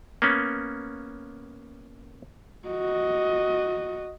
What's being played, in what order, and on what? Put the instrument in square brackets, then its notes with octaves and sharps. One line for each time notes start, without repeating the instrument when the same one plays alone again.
[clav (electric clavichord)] A#3 B3 C#4
[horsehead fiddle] F#4 D#5